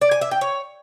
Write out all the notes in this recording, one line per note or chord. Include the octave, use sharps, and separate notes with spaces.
D5
G#5
E5
G5
C#5